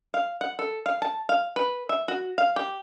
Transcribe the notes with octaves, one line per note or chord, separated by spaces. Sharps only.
F5
F#5
A4
F5
A5
F5
B4
E5
F#4
F5
G4